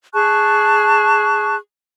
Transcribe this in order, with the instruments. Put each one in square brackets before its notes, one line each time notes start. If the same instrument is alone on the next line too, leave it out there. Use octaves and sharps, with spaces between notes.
[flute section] G#4 A5 C#6 F#6